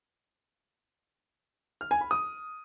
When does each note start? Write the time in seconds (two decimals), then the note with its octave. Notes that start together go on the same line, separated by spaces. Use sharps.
1.81 F6
1.91 G#5
2.01 B5
2.11 D#6